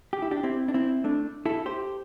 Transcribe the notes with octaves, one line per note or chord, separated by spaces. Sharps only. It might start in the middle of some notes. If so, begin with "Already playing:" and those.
G4
E4
D4 G4
C4 E4
D4
C4 E4
A3 D4
E4 A4
G4 C5